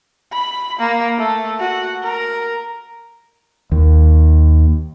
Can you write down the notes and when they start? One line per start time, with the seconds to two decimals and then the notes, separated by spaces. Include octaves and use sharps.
0.33 B5
0.79 A#3
1.18 A3
1.60 F#4
2.03 A#4
3.72 D#2